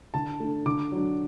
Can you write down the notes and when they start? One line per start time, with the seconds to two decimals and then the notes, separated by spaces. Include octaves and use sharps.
0.14 D3 A5
0.40 A3 D4
0.66 D3 D6
0.92 F#3 D4